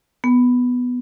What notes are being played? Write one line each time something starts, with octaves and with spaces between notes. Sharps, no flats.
B3